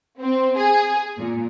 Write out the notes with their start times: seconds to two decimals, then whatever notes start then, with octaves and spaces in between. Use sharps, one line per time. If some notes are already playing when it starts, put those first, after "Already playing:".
0.20 C4
0.57 G#4
1.18 A#2